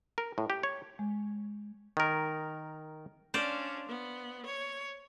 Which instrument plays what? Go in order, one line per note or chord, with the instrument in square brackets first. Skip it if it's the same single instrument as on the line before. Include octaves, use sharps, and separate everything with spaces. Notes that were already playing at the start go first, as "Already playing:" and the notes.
[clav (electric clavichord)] A#4
A2
G4
C#5
[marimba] G#3
[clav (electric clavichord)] D#3 A#4
[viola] C#4 D4 [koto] C5 D5 F5
[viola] B3
C#5